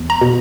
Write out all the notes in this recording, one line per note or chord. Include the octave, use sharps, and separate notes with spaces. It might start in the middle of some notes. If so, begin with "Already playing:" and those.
Already playing: E2
A#5
B2